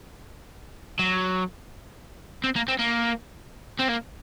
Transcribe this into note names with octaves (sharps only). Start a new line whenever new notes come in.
F#3
C4
A#3
C4
A#3
C4
A#3